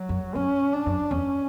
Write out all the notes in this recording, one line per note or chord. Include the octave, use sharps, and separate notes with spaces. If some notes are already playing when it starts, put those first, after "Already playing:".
Already playing: F#3
F#2
F#2 C#4
D4
F#2
E2 C#4